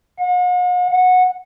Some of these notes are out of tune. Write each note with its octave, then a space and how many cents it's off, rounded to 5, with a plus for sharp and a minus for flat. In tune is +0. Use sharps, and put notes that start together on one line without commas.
F#5 -45
F#5 -15